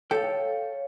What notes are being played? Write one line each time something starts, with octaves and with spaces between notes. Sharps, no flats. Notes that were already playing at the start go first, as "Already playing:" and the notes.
A4 C#5 F5 G5